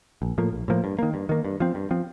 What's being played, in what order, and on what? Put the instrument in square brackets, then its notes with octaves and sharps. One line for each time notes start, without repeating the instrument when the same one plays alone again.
[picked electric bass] A#1
A2 F3 A#3
A#1
A2 F3 A#3
G2
D#3 A#3
G2
D#3 A#3
G2
F3 C4
G2
F3 C4